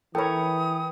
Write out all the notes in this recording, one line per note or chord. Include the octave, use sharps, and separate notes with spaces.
E3 A4 A#4 C#5 G5 B5 D#6